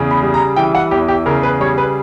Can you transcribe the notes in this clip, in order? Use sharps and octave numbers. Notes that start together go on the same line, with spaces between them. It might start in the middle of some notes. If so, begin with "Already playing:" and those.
Already playing: E2 C#3
B5
G3
A#5
E3 G5
F#5
E2 G4
G4
C#3 A#4
B4
G3 C#5
B4